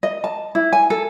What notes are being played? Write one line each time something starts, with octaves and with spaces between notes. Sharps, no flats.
D#5
A5
E4
G#5
A4